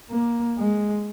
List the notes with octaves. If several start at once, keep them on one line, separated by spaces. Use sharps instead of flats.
A#3
G#3